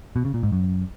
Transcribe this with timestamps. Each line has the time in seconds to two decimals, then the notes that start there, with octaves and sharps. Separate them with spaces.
0.16 B2
0.25 C#3
0.34 A#2
0.43 G#2
0.52 F#2